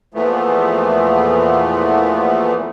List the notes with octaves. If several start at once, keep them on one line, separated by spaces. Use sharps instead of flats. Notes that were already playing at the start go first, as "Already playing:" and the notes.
E2 A#2 E3 F3 A3 B3